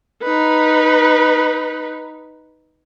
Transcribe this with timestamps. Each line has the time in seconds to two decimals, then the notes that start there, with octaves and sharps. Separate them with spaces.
0.23 D#4 B4